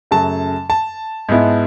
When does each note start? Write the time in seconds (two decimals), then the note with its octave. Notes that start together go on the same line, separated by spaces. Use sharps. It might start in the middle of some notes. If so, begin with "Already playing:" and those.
0.11 F#2 C#3 F#3 A3 A5
0.70 A5
1.29 G#2 G#3 B3 E4